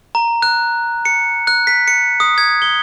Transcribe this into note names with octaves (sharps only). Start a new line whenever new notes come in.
A#5
F#6
C#7
F#6
B6
C#7
D#6
G#6
G7